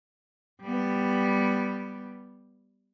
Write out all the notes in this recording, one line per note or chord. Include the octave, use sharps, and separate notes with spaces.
G3 B3